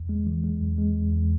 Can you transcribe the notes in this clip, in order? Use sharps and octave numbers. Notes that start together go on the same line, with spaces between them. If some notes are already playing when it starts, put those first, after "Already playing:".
Already playing: E2
G#3
E3
G#3
E2
G#3
E2
E2